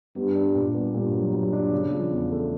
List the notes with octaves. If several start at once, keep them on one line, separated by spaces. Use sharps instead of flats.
G2 B3
D4
A#2
B3
G2 A#2
F#3
F#3
D4
C#3
F3
E2
A3